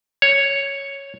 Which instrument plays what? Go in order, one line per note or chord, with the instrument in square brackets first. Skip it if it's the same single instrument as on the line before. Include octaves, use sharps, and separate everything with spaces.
[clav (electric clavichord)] C#5